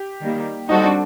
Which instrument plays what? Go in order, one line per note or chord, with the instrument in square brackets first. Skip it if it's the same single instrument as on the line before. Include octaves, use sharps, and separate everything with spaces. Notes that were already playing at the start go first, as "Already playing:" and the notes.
Already playing: [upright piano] G4
[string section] D#3 G3 A#3
[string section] G3 C4 F#4 A4 [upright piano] D#4
[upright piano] D4